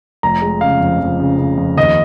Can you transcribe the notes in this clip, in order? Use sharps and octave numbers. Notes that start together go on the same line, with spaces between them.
F1 A#5
G#3
C#3 F5
F2
F2
C#3
C#3
F2
D#2 D#5